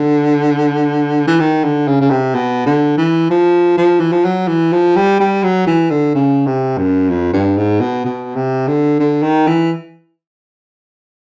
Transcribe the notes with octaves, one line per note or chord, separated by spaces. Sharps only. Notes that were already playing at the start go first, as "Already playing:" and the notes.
Already playing: D3
E3
D#3
D3
C#3
C#3
C3
B2
D3
E3
F3
F3
E3
F3
F#3
E3
F3
G3
G3
F#3
E3
D3
C#3
C3
F#2
F2
G2
G#2
B2
B2
C3
D3
D3
D#3
E3